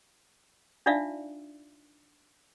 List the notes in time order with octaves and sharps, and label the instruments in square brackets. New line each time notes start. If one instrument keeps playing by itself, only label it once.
[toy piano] D4 D#4 F4 D5 E5 F5